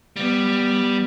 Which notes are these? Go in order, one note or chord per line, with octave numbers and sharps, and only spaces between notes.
G3 B3